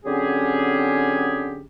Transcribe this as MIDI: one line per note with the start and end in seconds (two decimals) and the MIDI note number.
0.05 1.64 50
0.05 1.64 54
0.05 1.64 60
0.05 1.64 61
0.05 1.64 67
0.05 1.64 68